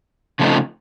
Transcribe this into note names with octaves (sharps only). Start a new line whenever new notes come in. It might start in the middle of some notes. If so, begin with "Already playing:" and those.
C#3 F3 A3 C4 D#4